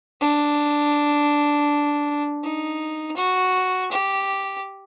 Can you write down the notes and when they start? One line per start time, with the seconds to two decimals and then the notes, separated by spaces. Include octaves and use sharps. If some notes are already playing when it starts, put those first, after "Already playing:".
0.21 D4
2.43 D#4
3.17 F#4
3.91 G4